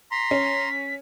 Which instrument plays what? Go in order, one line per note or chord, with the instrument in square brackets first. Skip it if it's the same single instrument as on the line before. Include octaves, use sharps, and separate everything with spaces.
[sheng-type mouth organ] A#5 C6 [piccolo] B6
[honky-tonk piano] C#4